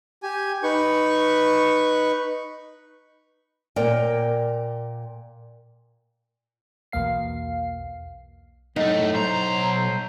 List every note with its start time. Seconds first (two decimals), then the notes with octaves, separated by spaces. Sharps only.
0.23 G4 G#5
0.63 D#4 B4 C#6
3.76 A#2 A#4 D5 G5
6.92 B1 E2 A#3 F5 C7
8.76 F#2 A2 A3 D#4
9.14 B1 F#3 C5 A#5